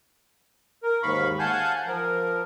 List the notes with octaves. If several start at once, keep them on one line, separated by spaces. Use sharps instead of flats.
A#4
D#2 G#2 F5 B5 C#6
F5 F#5 G#5 A5 G6
F3 A#4